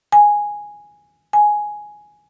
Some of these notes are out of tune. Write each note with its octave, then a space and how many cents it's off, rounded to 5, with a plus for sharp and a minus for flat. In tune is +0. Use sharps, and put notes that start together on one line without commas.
G#5 -5
G#5 +5